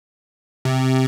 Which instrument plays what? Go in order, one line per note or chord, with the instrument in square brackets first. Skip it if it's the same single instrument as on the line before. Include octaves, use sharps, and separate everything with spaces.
[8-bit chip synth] C3